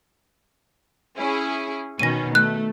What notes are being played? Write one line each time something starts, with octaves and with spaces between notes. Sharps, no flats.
C#4 E4 G#4
B2 D#3 C#4 A#6 D#7
A3 F#6